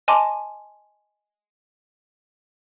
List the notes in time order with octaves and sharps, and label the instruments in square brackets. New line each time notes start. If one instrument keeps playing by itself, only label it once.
[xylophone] D#5 G#5 A5 C6 D6